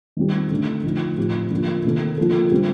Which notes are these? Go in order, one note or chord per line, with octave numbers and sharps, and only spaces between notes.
D#3 G3 C4 G4
D3 A3 D4
D3 F3 A3 D#4
A2 F3 C4 G4
D3 F3 A#3 F4
C3 D#3 A#3 D#4 A4
D3 F3 A#3 F4 A4
D3 G3 C4 G4